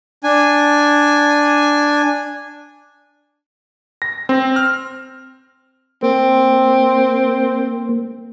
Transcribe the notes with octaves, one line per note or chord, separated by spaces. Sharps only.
D4 G#5
A#6
C4
F6
A#3 C4